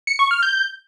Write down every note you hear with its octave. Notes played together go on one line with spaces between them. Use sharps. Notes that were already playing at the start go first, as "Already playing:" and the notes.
C#7
C#6
F6
G6